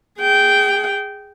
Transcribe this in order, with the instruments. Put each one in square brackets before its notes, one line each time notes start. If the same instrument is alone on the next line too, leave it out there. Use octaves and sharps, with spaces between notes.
[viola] G#4 G5